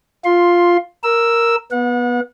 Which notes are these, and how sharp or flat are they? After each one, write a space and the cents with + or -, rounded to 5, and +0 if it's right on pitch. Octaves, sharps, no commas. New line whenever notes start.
F4 +0 C6 +10
A#4 +0 E6 +0
B3 -15 F#5 -35